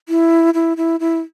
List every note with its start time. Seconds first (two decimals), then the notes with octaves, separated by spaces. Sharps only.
0.09 E4
0.54 E4
0.77 E4
1.00 E4